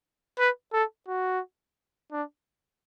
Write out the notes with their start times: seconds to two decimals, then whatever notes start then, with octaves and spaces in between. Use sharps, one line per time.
0.39 B4
0.73 A4
1.08 F#4
2.12 D4